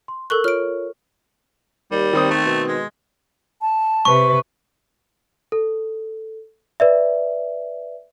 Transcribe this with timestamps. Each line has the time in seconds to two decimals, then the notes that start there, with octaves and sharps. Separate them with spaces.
0.08 C6
0.30 A4 A#4 C#6 E6 F#6
0.44 F4 C#5 F6 D7
1.91 D#2 G3
2.13 D#3 C4 D#6
2.31 A3
2.46 B2
2.68 G#3
3.62 A5
4.05 C3 B4 C#6
5.52 A4
6.80 B4 D5 E5